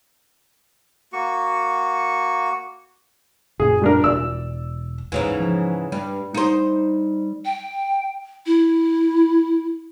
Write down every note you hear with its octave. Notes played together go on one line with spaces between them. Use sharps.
A#3 F#4 C#6
F#1 A#2 G#4
G3 D4 A#4
E1 D5 E6
D#2 G#2 C#3 E3
F3
G2 G3
D#4 C5
G5
E4